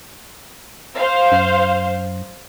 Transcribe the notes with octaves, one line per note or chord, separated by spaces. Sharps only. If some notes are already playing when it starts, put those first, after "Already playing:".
C5 F5
F#2